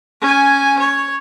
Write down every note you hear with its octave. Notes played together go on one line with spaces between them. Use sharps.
C#4 G#5
C#5